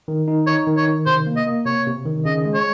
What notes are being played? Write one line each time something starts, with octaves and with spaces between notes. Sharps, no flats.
D#3
D#4
D#4 C#5
D#3
C#5
D#3
C3 C5
A#3
D#5
A#3
C3 C#5
C3
D#3
C#3 D#5
G#3
C#5